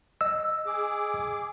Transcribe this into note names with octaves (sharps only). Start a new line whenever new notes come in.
D#5 E6
G#4 D6